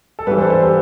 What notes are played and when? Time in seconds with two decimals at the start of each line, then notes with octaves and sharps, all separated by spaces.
0.19 A4
0.27 G2 G4 B4
0.31 E3
0.38 A4 C5
0.50 A4 C5
0.63 G4 B4